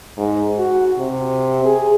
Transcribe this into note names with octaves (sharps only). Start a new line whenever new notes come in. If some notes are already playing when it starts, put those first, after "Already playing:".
G#2
F#4
C3
G#4